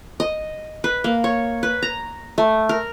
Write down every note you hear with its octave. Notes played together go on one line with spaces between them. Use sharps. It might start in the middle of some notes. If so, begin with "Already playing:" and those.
D#5
B4
A#3
C#5
B4
A#5
A3
A#4